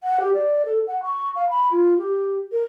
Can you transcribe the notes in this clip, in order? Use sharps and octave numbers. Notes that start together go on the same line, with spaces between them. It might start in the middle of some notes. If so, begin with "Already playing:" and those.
F#5
G4
D5
A4
F#5
C#6
F5
B5
F4
G4
A#4